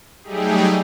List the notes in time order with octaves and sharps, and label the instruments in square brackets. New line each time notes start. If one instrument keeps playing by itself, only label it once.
[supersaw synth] F#3 G3 A3 D#4 G4 G#4